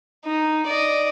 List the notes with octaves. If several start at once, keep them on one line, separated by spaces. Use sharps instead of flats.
D#4
D5 D#5